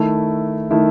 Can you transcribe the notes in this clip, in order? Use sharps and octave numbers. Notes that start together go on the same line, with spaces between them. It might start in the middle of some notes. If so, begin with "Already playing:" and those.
Already playing: D#3 A3 E4
D#3 A3 E4